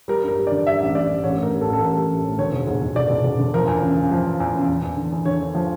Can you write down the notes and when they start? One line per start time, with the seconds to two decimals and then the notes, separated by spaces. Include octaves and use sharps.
0.08 G3 A#4
0.24 G2 A#4
0.38 G3
0.47 D3 D5
0.66 G3 E5
0.80 A1
0.95 G3 D5
1.09 G2
1.23 A1 C#5
1.38 A2
1.43 A#4
1.52 G3
1.61 A4
1.67 A1
1.73 A4
1.81 A1 A#4
1.96 G3
2.10 A1
2.24 A2
2.39 D2 C#5
2.53 E1
2.67 E1
2.82 E1
2.96 E1 D5
3.10 E1
3.24 E1
3.39 D3
3.54 F3 A#4
3.68 E2
3.82 C#3
3.96 C#3
4.11 F3
4.26 E2
4.40 E2
4.54 C#3
4.68 E2
4.83 E2
4.97 D3
5.12 E2
5.25 D3 C#5
5.41 D3
5.55 F3